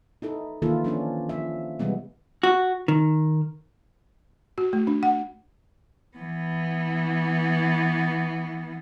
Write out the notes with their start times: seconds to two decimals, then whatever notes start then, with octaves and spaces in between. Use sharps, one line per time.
0.22 D#4 E4 A4
0.62 D#3 E3 A#3 E4 F4 A4
0.84 F3 C#4 D4
1.29 F3 E5
1.79 C3 E3 G3 G#3 B3
2.43 F#4
2.88 D#3
4.58 F#4
4.73 A3
4.87 D4
5.03 F#5
6.17 E3 B3